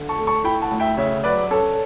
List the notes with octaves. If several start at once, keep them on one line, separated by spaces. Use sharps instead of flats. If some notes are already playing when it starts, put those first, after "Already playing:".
Already playing: D3
A5 C#6
A3
A5 C#6
E4 G5 B5
F#5 A5
D2
E5 G5
C#3 C#5 E5
F#3 B4 D5
C#4 A4 C#5